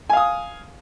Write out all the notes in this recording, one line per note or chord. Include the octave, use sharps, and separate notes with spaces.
F5 G#5 D#6